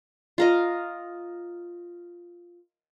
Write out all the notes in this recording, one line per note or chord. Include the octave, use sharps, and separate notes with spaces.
F4 A#4 D#5